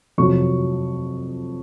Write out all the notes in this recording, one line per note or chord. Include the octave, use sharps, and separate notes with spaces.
F2 C3 F#3 C#6